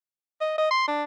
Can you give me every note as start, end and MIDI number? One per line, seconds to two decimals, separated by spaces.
0.41 0.57 75
0.58 0.69 75
0.71 0.87 84
0.88 1.04 62